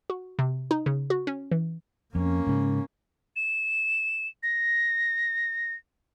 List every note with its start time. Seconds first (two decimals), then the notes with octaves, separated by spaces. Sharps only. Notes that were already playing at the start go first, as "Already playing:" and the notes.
0.10 F#4
0.39 C3
0.71 D#4
0.86 C#3
1.10 F#4
1.27 C#4
1.51 E3
2.15 F2 A#3 C#4
2.47 G#2 C#3
3.36 E7
4.43 A#6